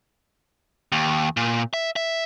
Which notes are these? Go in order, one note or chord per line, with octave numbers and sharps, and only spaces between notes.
D#2
A#2
E5
E5